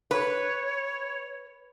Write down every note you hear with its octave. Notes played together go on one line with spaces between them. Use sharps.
B4 C#5